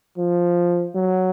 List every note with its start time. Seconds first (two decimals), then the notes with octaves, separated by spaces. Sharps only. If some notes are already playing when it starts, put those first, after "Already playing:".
0.18 F3
0.95 F#3